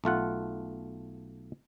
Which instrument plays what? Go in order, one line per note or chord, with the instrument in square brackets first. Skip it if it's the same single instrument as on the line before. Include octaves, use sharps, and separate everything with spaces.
[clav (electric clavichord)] B1 A3 F4 F#5